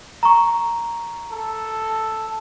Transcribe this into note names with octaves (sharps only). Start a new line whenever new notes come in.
A#5 C#6
A4